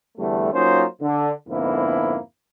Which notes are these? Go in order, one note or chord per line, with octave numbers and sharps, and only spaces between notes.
E2 D3 G3 A3
F#3 A#3 C#4 D#4 F4 C5
D3
F2 G#2 D3 A#3 B3 E4